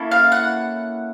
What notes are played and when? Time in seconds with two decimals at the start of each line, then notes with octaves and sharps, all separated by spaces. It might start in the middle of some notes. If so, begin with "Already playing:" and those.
Already playing: A#3 C#4 E4 A4
0.11 F5
0.32 F#5